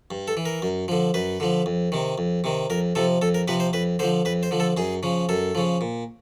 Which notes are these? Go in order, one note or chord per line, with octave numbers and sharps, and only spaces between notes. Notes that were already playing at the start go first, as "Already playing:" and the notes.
G2
A4
E3
A#4
F#2
D3 F3
F#2 B4
D3 F3
F2
C3 D#3
F2
C3 D#3
F2 A#4
C3 F3 A4
F2 A4
A#4
C3 F3 B4
C5
F2 B4
D3 F3 C5
F2 B4
C5
D3 F3
A4
F#2 G#4
C#3 F3
F#2 A4
C#3 F3
A#2